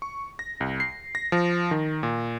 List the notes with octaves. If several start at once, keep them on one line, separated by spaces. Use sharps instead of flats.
C#6
A#6
C2
C7
A#6
F3
D#3
A#2